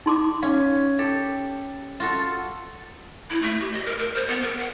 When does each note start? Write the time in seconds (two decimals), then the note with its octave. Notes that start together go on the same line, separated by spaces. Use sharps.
0.06 D#4 C6 D6
0.43 C#4 F5
0.99 G4 A4
2.00 F4 F#4 A4
3.30 E4
3.42 A3
3.60 G4
3.73 D#5
3.86 A#4
3.99 A#4
4.15 C5
4.28 B3
4.42 A#4
4.58 F#5